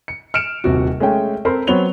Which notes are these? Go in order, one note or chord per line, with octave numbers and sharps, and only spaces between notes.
C#7
F6 C#7 D7 E7
D#1 C3 F#4
G#3 A3 C#4 G5
C4 A4 A#4 C5 B5
F#3 B3 C4 C#5 F7 G7